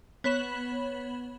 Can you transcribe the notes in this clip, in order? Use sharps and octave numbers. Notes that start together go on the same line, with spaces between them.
B3 C#5 B5 E7 F#7